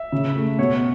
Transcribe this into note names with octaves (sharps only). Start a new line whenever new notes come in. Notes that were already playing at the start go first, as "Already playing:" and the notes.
Already playing: E5
C#3
A3
B2 C#5